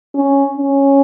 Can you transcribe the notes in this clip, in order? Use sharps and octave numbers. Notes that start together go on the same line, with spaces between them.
C#4
C#4